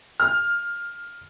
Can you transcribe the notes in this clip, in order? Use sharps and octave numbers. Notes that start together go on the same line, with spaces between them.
F6